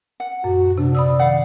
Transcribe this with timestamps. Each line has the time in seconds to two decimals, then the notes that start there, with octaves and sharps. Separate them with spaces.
0.20 F#5
0.44 F#2 A#2 F#4
0.78 C3 D4
0.95 D5 B5 D#6 E6
1.19 D#3 F5 F#5